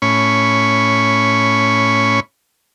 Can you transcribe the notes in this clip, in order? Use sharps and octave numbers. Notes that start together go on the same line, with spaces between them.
A2 C#4 B5 C#6